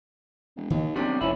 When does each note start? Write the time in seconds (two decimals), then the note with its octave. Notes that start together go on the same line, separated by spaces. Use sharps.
0.56 E1
0.70 D#2 D#3
0.96 B1 C3 G3 D4
1.21 F1 B1 C#4 E4